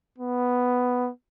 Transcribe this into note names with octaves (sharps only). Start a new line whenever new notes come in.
B3